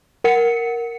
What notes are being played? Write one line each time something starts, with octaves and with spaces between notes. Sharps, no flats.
A#4 F#5 C#7